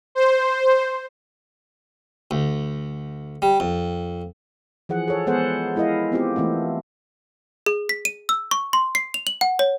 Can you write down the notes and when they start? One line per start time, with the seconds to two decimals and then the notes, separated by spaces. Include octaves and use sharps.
0.15 C5
2.31 D2
3.42 G3
3.60 F2
4.89 E3 F3 G#4 F#5
5.08 G#4 A4 C#5
5.26 G#3 B3 G#4 A4 C5 F#5
5.76 G#3 E4 A#4 D#5 F5
6.12 B3 C4 F4 G4
6.36 E3 A3 A#3 C4
7.66 G#4
7.89 B6
8.05 D#7
8.29 E6
8.51 C#6
8.73 C6
8.95 C7
9.14 F7
9.27 F#7
9.41 F#5
9.59 C#5